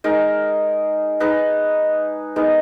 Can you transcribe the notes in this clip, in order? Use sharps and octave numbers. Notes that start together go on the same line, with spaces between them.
G#3 D#4 A#4
D#4 G#4 B4 D#5
G#3 B3 D#4 A#4